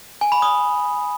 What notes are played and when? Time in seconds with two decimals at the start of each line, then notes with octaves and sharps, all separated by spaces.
0.21 G#5
0.32 B5
0.42 D#6